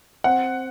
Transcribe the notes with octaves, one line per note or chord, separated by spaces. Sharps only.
C4 F#5